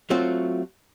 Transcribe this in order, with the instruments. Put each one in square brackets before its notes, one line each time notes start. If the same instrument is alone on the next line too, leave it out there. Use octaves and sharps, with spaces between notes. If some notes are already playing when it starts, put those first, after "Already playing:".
[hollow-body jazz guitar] F#3 A3 C4 F4 F#4